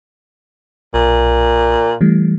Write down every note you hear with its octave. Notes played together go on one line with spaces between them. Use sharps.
B1 A#2
E3 G3 A3